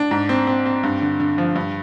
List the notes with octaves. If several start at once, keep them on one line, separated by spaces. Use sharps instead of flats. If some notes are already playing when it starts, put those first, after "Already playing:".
Already playing: D4
G#2
C4
C4
C4
G2
D3
D3
F3
G2